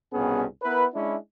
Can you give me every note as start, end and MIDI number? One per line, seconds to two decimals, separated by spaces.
0.13 0.44 36
0.13 0.44 43
0.13 0.44 47
0.13 0.44 59
0.13 0.44 61
0.13 0.44 68
0.63 0.84 59
0.63 0.84 64
0.63 0.84 70
0.63 0.84 71
0.94 1.15 56
0.94 1.15 61
0.94 1.15 62
0.94 1.15 64